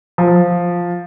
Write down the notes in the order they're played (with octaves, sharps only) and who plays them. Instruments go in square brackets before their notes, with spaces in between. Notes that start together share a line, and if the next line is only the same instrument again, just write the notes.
[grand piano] F3